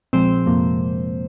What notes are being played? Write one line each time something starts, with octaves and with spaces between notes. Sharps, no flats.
A#1 A#2 F3 G#3 C4 C5
F2 C3 F3 A#3